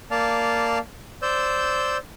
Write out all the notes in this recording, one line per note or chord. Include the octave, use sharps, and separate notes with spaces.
A#3 D5 F5 A5 F6
C5 D5 E6 G6